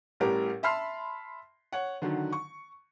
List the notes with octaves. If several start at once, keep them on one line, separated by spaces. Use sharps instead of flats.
A1 A2 G3 G4 A#4
E5 A5 B5 C6 F6 C7
C#5 F#5
D3 D#3 F#3
C#6